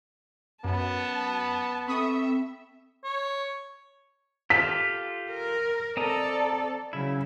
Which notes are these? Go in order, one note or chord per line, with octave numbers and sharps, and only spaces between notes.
F#2 B3 A5
C4 A4 E5 B5 C#6 D#6
C#5
F4 G4 A4 B6
A#4
C4 A4 D5 D#5 A#5
C#3 F#3 E4